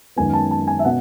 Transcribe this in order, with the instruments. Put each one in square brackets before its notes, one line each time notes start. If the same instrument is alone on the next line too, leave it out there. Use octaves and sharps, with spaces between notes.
[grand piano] F#2 D#3 G#3 B3 G#5
A5
A5
G#5
E5
B2 F#5